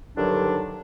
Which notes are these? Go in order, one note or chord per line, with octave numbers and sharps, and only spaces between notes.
G2 D3 D#3 F#3 D4